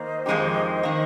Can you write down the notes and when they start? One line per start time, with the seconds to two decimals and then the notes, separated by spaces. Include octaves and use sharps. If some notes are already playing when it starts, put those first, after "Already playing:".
Already playing: D#3 A#3 C5 D#5
0.26 F2 D#3 G#3 D#4 G4
0.83 D#3 A#3